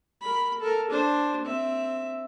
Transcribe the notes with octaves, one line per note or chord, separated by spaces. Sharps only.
A#4 B5
A4 A#4
D4 C5
C4 E5